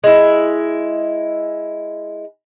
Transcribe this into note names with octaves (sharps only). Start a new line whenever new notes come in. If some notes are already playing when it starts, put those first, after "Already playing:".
G#3 E4